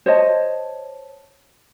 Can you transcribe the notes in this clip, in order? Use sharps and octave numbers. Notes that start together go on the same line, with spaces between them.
C5 C#5 D#5 A5